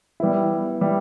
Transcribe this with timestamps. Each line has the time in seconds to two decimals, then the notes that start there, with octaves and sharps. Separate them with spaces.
0.20 G3 B3 E4
0.81 G3 B3 E4